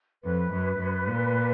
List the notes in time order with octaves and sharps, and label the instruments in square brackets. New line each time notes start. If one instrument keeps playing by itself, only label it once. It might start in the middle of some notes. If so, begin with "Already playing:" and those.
[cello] F2 [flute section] B4
[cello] F#2
F#2
A#2